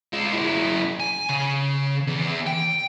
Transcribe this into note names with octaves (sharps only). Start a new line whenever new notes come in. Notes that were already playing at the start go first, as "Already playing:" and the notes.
G#3 F4
F#2 E4
G#5
C#3
E2
G5